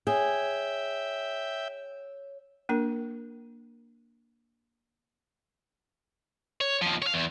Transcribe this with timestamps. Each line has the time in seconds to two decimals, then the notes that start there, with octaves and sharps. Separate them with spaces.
0.07 G#4 C#5 E5 G5
2.69 A#3 D4 A#4
6.61 C#5
6.82 D#2 F3
7.02 C#5 F5
7.14 E2